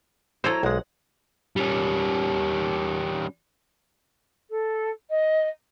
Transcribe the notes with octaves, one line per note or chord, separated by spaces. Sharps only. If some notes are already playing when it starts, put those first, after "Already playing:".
F#3 E4 A4 C5 A#5
B1 G#3 F#5
G3 C#4
A4
D#5